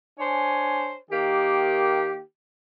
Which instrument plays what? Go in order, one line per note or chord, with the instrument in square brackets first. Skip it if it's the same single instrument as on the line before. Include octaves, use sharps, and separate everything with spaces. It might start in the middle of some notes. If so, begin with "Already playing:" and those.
[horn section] D4 C5 C#5 G#5
D#3 A#3 G4